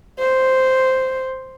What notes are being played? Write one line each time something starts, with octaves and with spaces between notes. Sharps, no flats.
C5